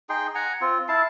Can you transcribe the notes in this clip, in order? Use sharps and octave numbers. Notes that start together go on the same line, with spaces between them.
D#4 G#4 G5 C6
F#5 G#5 A#5
C4 F4
E4 F5 A5